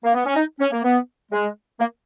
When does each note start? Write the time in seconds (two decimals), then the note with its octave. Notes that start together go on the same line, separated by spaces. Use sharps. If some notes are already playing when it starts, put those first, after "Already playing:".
0.04 A#3
0.14 B3
0.25 C#4
0.35 D#4
0.60 C#4
0.72 A#3
0.83 B3
1.31 G#3
1.79 A#3